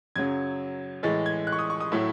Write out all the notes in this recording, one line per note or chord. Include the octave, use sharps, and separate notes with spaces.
F#2 C#3 F#3 G#6
A2 E3 G#3 A6
G#6
F#6
C#6
D#6
C#6
D#6
A2 F#3 A3 E4